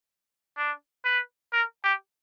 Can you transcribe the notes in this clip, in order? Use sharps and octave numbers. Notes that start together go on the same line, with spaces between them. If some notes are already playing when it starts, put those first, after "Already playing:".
D4
B4
A#4
G4